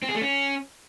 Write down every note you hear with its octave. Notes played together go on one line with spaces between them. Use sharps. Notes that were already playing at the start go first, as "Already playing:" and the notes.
C4
G#4
A3
C#4